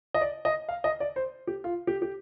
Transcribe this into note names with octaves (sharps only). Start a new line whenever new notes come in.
D#5
D5
D#5
F5
D#5
D5
C5
G4
F4
G4
G4